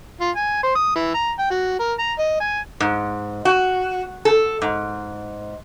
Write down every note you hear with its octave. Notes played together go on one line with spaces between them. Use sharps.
F4
G#5
C5
D#6
E3
A#5
G5
F#4
A#4
A#5
D#5
G#5
G#2
F#4
A4
G#2